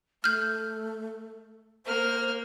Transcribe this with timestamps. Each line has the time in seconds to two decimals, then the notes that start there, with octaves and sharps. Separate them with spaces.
0.24 A3 F6 G6
1.86 A#3 C5 F6